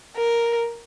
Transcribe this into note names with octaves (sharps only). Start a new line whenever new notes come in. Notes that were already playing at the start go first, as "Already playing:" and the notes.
A#4